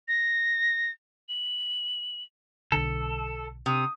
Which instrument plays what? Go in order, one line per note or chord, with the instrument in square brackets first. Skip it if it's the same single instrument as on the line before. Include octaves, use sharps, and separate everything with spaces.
[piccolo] A#6
F#7
[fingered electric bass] B1 D3 [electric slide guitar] A4
[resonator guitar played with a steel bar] C3 [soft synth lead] D#6